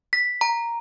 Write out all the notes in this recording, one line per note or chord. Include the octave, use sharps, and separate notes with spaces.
B6
A#5